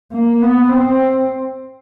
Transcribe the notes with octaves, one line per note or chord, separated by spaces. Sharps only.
A#3
B3
C4